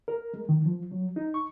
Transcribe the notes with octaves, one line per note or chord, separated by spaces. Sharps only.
A#4
G#3
D#3
F3
F#3
D#4
C#6